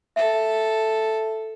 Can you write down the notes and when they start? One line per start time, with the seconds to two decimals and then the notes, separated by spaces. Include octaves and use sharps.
0.16 A4 E5